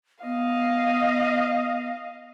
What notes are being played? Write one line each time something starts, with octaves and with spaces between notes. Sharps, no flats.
B3 D#5 F5